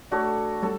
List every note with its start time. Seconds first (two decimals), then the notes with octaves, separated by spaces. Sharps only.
0.11 A3 D4 F#4 A4 C#5
0.62 G3 A4 C#5